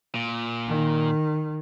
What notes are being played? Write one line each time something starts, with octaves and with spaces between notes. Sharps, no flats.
A#2
D#3